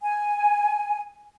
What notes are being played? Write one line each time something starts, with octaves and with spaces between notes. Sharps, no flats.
G#5